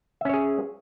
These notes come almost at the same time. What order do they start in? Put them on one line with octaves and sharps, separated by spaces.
E5 C#4 C#5 G#4